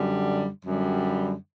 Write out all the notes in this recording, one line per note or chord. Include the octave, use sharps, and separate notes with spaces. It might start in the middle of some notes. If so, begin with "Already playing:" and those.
Already playing: F#2 D3 G3
F#2 D3 G3